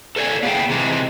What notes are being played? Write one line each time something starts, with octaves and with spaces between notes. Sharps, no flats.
A4 A#4 C#5 D5 G#5
A#3 B3 E4 G#4 F5 G5
C3 E3 G#3